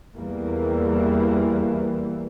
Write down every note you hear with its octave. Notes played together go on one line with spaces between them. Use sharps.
E2 E3 G3 A#3